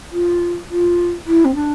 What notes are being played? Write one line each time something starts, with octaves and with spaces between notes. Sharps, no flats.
F4
F4
E4
C4
D4